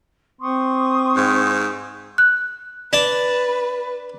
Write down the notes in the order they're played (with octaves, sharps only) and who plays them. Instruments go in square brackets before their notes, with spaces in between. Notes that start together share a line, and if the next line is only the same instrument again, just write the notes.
[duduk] C4 [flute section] C6 C#6 D#6
[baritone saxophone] G#2
[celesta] F#6
[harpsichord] D4 A5 [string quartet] B4